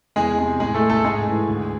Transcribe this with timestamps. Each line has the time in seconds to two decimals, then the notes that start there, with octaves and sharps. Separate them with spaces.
0.16 E2 G#3 G#4
0.39 C3 G#3
0.60 A2 G#3 G#4
0.74 A3 A4
0.82 G#3
0.89 A3 A4
1.04 G#2 G#3 G#4
1.25 E3 A3
1.48 D2